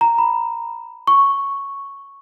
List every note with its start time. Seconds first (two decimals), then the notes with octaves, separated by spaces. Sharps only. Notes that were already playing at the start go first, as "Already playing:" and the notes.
0.01 A#5
0.18 B5
1.07 C#6